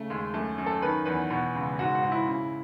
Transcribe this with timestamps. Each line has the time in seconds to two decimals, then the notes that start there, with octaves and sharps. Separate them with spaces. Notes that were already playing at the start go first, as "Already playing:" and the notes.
Already playing: C#3 A3
0.10 D#2 G#3
0.34 F#2 A3
0.58 F#2
0.66 A4
0.82 D#3 B4
1.05 E2 B4
1.30 B2
1.55 C#2
1.79 G#2 F#4
1.95 F#4
2.03 G#2
2.12 E4
2.28 C#3